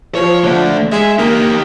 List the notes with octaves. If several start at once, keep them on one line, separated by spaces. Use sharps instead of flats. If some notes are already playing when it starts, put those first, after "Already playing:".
F3 C#5
D3 A3
G#3 E5
A#3 D#4 G4